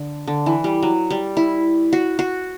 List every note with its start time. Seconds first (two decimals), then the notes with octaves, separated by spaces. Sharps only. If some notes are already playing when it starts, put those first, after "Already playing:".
Already playing: D3
0.27 D3
0.46 E3
0.64 G3
0.83 F#3
1.10 G3
1.37 E4
1.93 F#4
2.19 F#4